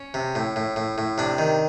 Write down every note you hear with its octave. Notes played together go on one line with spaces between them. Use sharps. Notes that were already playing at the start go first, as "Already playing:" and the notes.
Already playing: C#4
C3
A2
A2
A2
A2
C3 D4
D#3